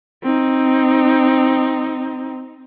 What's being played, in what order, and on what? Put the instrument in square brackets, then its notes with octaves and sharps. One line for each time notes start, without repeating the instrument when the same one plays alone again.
[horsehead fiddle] C4 D#4